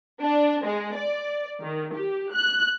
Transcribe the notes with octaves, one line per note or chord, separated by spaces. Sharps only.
D4
G#3
D5
D#3
G4
F#6